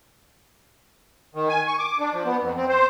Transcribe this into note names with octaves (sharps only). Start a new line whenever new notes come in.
D#3
G#5
C#6
D6
D4
F3
B3
F2
C4
C5